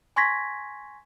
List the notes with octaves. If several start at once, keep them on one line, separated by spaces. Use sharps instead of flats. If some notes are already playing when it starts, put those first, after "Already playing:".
G#5 C6 C#6 G#6 A#6 B6